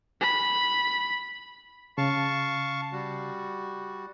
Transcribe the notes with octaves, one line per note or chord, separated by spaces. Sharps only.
B5
C#3 F5 A5 C#6
G3 F#4